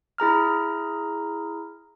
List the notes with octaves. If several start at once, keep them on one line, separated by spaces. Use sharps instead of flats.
E4 G#4 A#5 F6